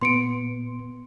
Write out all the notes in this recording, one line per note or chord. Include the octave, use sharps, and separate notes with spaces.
A#2 B3 C6 C#7 D7